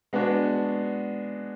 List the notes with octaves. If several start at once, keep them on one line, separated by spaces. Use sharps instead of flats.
G#3 B3 D4 F#4